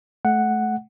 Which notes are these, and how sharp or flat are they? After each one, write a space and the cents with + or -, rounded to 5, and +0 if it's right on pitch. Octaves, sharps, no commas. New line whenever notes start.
A3 -25 F#5 +0